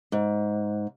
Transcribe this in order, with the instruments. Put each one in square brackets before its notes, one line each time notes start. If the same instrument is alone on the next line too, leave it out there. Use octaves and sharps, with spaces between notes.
[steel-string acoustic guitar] G#2